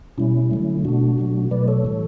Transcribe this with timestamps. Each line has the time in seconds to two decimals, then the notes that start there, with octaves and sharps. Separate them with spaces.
0.18 B2 G3 C#4 E4
0.51 D3 F#3 A3
0.85 B2 A3 D4 F#4
1.18 B2 F#3 A3
1.51 B2 F#3 A3 B4 D5
1.68 A4 C#5
1.85 A2 E3 G3